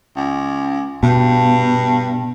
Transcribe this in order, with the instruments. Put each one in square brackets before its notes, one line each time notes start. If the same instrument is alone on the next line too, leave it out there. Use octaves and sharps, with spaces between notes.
[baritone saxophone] C#2
[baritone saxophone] G2 [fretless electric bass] B2